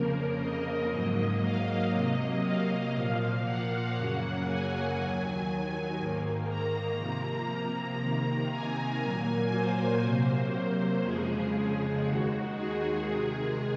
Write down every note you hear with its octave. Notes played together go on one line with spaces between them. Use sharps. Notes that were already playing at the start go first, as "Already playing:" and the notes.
Already playing: F2 C#3 F3 A#3 A#4
D#5
G#2 F#3 A#3
F5
C3 F#3 A#3 D#5
F5
A#2 F3 A#3
F#5
F#2 C#3 F#3 A#3
G#5
D#2 D#3 F#3
G#2 D#3 A#3
A#5
C3 F3 A#3
A#5
C3 D#3 A#3
G#5
A#2 F#3 A#3
C5
C3 F#3 A#3
F2 C#3 F3 G#3 G#4
D#2 D#3 G#3 F#4
G#4
C3 D#3 G#3